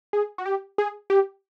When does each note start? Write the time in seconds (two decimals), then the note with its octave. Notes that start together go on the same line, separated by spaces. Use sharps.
0.13 G#4
0.38 F#4
0.46 G4
0.78 G#4
1.10 G4